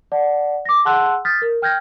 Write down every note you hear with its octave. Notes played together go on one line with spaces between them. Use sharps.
D5 F#5 A5
D6 A#6
G#4 F#5 A5 C6 E6 F#6
D#6 F6 G6 A6 B6
A#4
G5 F6 G6 G#6 A#6